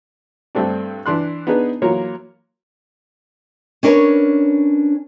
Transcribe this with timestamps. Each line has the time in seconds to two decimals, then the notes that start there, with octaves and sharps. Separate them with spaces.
0.55 G2 A3 C4 D4
1.06 E3 D4 C6 F#6
1.47 B3 D4 D#4 G#4 B4
1.82 E3 F#3 A#3 F4 C#5
3.83 C#4 D4 A#4 B4 C#5